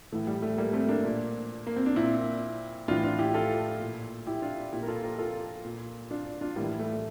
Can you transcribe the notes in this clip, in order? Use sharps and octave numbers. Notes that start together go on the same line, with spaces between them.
A2 E3 A3
G3
A3
G3 A#3
A3 C4
A#3 D4
A#2
A#3
C4
D4
A#2 C4 E4
A2 E3 D4 F4
D4 F4
E4 G4
F4 A4
A#2
E4 G4
D4 F4
A#2 E4 G4
A#4
F4 A4
G4 A#4
F4 A4
A#2
D4 F4
D4 F4
A2 E3 G3 A#3
A3